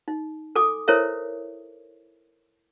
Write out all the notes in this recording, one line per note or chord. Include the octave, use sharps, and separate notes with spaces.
D#4
A4 G#5 D6 D#6
E4 A4 A#4 C5 C#5 E5